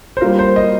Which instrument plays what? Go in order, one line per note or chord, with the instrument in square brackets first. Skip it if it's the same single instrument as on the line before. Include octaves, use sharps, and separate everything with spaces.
[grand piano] C5
[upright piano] G3 A#3 F4 [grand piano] A#4
[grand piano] C5
D#5